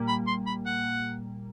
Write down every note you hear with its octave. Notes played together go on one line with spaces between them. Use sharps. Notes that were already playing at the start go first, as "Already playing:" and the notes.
Already playing: A#2 G3 A#3
B5
C6
B5
F#5